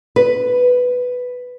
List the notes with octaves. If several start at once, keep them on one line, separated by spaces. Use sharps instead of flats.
B4